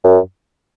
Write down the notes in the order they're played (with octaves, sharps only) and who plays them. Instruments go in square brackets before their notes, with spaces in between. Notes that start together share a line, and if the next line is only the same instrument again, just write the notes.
[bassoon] F#2